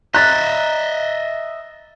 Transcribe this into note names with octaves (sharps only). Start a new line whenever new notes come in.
D#5 E5 A#5 B5 F#6 A6